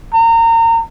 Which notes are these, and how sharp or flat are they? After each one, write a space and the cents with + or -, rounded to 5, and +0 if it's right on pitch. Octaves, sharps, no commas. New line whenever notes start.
A#5 -30